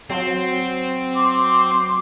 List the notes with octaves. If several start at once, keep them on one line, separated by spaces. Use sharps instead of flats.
F#3 C4
C6 D6